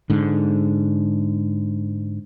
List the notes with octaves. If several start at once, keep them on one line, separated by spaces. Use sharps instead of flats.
G#2 D3